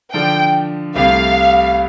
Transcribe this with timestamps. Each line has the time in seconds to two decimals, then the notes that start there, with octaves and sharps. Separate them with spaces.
0.13 D3 F3 D4 G5
0.95 C2 C3 A3 F5